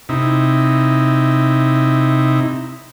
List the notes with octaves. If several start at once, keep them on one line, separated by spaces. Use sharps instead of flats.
C3 D#4 E4